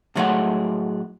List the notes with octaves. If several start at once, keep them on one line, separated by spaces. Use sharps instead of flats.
A2 C3 F#3 G#3 A3 F#5